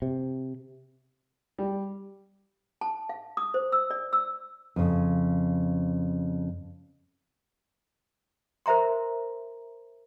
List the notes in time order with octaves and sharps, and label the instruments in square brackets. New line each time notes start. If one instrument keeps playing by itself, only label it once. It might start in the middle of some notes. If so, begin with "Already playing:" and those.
[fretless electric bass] C3
[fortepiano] G3
[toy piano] A5
F5
D#6
C5
E6
D5
E6
[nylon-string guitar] F2 C#3
[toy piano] A#4 C5 E5 A#5 C6